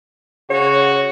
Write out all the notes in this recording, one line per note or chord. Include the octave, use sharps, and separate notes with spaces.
C#3 F#4 C#5